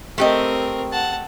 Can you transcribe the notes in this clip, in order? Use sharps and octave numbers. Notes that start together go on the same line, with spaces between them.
A3 C4 G4 A#4 D#5
F#5 A5